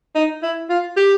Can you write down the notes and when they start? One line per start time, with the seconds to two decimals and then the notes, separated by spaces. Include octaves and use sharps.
0.15 D#4
0.43 E4
0.70 F4
0.97 G4